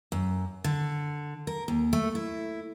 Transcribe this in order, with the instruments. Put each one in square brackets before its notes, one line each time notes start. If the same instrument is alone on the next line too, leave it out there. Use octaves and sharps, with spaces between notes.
[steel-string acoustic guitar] F#2
D3
A#4
D#2
A3
E4